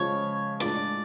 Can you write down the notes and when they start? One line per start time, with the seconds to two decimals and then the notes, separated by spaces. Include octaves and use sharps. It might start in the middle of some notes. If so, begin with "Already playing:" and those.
Already playing: C#3 F3 G#3 C#5
0.60 A2 G#3 D4 F4 D5